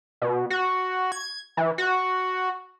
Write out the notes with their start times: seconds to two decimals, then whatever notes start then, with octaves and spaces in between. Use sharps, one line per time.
0.22 B2
0.50 F#4
1.12 G#6
1.57 E3
1.78 F#4